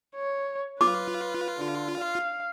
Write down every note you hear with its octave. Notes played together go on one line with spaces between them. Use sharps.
C#5
F4 B4 D6
D3
F5